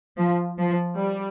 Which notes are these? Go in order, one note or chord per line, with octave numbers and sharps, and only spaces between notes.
F3
F3
G3